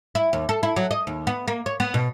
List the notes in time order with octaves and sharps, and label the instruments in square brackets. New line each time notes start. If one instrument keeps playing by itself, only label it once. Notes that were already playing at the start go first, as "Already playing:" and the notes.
[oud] E4
D#2
A4
E4
F#3
D#5
D#2
B3
A#3
C#5
B3
B2